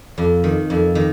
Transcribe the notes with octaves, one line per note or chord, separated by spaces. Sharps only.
F2
D#3
F2
D#3